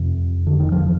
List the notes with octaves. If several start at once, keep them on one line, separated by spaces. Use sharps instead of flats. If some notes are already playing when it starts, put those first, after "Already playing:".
Already playing: F2 C3
D3
D#3
F3